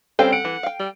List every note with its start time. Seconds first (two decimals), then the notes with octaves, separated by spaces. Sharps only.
0.19 G3 C4 C#4 A4 C5 F5 G5
0.32 F#5 D7
0.45 E3
0.63 F5 G5
0.80 G3